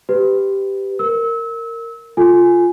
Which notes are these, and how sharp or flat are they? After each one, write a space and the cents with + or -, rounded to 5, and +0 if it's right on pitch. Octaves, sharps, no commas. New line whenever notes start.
G4 +0 B4 +30
A#4 -15 E6 -30
F4 +0 A4 +0 G#5 +0